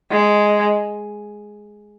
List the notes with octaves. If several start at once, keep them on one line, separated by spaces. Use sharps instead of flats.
G#3